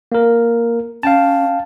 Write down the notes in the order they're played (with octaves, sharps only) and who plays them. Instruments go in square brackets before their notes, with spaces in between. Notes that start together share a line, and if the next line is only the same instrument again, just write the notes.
[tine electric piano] A#3 A#4
[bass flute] C#4 [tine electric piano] F5 G5 A5